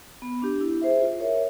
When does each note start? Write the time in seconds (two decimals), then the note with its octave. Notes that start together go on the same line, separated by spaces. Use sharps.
0.22 B3
0.42 D4 G4
0.61 E4
0.82 G#4 C5 E5
1.01 F4
1.20 A#4 C#5 E5